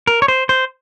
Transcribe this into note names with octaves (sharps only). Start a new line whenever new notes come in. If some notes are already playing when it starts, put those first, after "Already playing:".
A#4
C#5
C5
C5